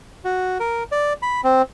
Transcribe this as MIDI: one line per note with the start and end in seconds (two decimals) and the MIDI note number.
0.25 0.58 66
0.60 0.83 70
0.92 1.13 74
1.22 1.41 83
1.44 1.62 60